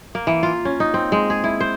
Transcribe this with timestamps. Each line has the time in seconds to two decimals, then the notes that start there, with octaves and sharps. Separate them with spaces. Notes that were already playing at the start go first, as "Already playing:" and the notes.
0.15 A#3
0.27 E3
0.43 F4
0.65 C#4
0.80 D#4
0.94 C4
1.12 G#3
1.30 G#4
1.44 E4
1.60 C5